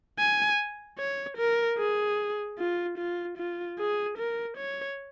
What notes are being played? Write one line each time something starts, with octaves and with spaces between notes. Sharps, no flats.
G#5
C#5
A#4
G#4
F4
F4
F4
G#4
A#4
C#5